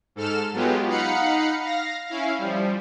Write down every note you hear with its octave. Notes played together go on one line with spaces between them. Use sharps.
G#2 A4 F6 E7
F#3 G#3 B3 F4 G4
D#4 F5 F#5 B5 C#7
F5 A#6
C#4 E4 F5
F3 G3